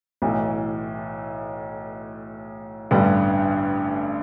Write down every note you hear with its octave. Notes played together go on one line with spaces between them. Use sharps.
B1 A2 E3
A1 G2 D3 G3 B3